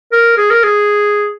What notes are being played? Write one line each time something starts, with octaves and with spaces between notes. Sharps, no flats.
A#4
G#4
A#4
G#4